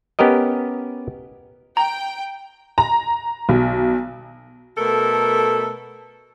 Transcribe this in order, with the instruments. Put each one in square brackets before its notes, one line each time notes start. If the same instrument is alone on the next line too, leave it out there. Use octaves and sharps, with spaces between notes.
[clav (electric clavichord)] B3 C#4 G4 A#4 D#5
[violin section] G5 [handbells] A#5
[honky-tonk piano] A#5
B1
[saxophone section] B2 A3 A4 A#4